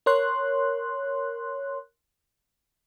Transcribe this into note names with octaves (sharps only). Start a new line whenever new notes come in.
A#4 C#5 C6 F#6